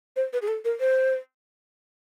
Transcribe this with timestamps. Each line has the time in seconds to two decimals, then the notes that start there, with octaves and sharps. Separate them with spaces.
0.16 C5
0.33 B4
0.42 G#4
0.48 A4
0.65 A#4
0.80 C5